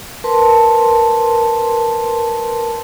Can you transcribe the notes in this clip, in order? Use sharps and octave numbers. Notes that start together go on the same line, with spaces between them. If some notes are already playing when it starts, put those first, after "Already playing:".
A#4 B4 A5 C6